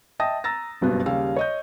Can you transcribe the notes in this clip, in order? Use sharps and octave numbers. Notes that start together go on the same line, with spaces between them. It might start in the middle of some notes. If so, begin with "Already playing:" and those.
D#5 E5 G5 A5 D#6 A#6
A#5 E6 A6 A#6
F#1 G2 B2 B3
D#2 C#3 G3 F5 E6
C#5 D#5 G6